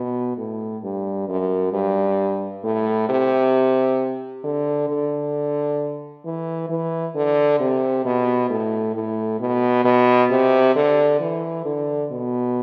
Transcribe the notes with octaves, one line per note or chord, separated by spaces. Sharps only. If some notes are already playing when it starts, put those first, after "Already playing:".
Already playing: B2
A2
G2
F#2
G2
A2
C3
D3
D3
E3
E3
D3
C3
B2
A2
A2
B2
B2
C3
D3
E3
D3
B2